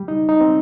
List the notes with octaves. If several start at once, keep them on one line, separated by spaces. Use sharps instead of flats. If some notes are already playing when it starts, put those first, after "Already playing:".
Already playing: G3
D#4
D#4
C4